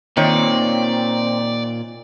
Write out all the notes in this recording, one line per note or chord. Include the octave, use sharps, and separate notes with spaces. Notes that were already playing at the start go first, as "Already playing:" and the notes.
A#2 D#3 C4 C#5 D5